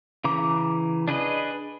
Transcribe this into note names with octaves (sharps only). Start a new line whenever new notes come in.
C#3 E3 A#5 D6
D4 G#4 B4 D#5